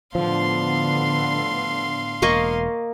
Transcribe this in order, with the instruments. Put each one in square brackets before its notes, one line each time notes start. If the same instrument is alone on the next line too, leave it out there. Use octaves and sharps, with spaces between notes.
[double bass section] A2 D3 B3 [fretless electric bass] F3 [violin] F5 C6
[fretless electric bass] E1 [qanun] A#3 D#5 C#6